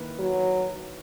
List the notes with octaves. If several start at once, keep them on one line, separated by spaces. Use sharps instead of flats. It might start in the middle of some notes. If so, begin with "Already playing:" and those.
Already playing: D#3 A#3 E4 B4
F#3